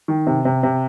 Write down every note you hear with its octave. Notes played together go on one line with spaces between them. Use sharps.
D#3
C3
C3
C3